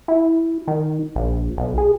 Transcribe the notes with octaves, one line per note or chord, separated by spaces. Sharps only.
E4
D#3
A#1
B1
G#4